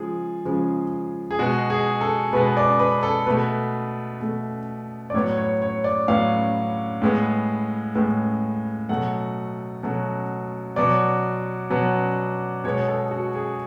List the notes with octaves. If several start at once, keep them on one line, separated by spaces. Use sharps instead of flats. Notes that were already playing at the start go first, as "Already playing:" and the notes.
Already playing: C#3 F3 G#3 G#4
C#3 F3 G#3
G#4
B2 G#3 B3 F#4
G#4
A4
B2 G#3 B3 B4
D5
B4
A4
B2 A3 B4
B2 A3
D5
A2 F#3 B3 C#5
C#5
C#5
D5
A2 F#3 B3 F5
A2 G#3 B3
A2 G#3 B3
B2 F#3 A3 F#5
B2 F#3 A3
B2 F#3 B3 D5
B2 F#3 B3
B2 G#3 B3 C#5
A4
F#4
G#4